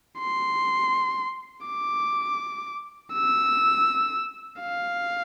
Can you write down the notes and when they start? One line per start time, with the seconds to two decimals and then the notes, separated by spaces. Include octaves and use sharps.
0.19 C6
1.67 D6
3.13 E6
4.61 F5